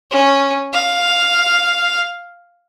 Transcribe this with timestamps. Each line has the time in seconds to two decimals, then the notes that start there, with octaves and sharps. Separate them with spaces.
0.11 C#4
0.73 F5